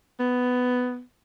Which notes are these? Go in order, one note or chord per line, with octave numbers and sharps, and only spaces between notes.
B3